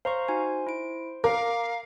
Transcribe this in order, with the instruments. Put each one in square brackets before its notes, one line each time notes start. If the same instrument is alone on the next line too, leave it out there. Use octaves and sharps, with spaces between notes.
[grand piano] C5 [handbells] F5 A#5 C#6
[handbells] D#4 F#4 G#5
E4 D7
[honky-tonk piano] A#4 [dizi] F5 [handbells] D6